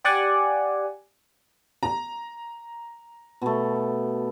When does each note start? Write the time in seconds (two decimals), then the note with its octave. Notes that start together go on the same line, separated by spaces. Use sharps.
0.04 G4 D5 F#5 G#5
1.83 A#5
3.42 B2 A3